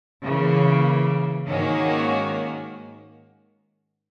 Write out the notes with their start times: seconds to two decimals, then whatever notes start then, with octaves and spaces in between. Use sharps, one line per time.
0.24 C#3 E3 A#3
1.47 G#2 D#3 A#3 C#4 F#4